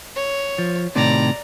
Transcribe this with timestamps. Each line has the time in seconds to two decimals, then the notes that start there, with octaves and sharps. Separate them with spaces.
0.16 C#5
0.59 F3
0.95 A2 C3 D#3 D5 A#5